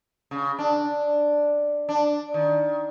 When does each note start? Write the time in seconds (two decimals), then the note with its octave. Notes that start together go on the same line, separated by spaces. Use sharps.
0.31 C#3
0.59 D4
1.89 D4
2.34 D#3